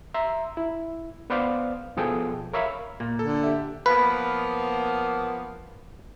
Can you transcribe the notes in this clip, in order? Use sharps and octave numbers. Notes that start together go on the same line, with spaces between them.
E5 A#5 C6
E4
B3 B4 C5 D5 F5
B2 F3 G#4 A4 G5
A#4 C#5 E5 F5 B5
A#2 A#3
D3 A4
G4 E5
F3 A#3 B3 B4